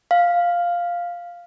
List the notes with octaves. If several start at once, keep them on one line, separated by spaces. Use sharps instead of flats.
F5